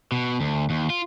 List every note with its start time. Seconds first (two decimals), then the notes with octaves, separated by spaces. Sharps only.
0.12 B2
0.41 D2
0.70 D#2
0.90 F4